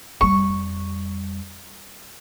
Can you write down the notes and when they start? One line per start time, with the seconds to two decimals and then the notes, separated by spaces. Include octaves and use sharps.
0.21 F2 G3 C#6